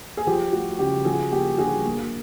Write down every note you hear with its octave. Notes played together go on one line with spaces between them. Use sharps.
G#4
F3 G4
A3 F#4
C#3 G4
F3 F#4 G#4
A#3 G4
D3 F#4 G#4
A#3